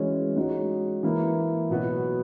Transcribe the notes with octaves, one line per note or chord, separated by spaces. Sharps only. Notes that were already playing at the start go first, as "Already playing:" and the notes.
Already playing: E3 G#3 C#4 F#4 C#5
G#3 D#4 F#4 C#5
E3 A#3 E4
B2 F#3 B3 F#4